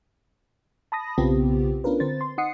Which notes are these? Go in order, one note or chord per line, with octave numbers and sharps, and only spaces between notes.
A5 B5 D#6 A#6
B1 C#3 B3 C4 F4 G4
B3 C#4 D4 F4 A#4 B4
D3 C4 C5 A6
C6
D#4 F#5 D#6 C7 C#7